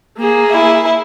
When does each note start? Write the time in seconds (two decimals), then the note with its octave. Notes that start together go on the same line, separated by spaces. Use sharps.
0.18 A#3 G#4
0.51 E4